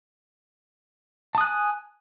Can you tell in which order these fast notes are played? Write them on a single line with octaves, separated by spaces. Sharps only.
A5 D#6 F#6 G#5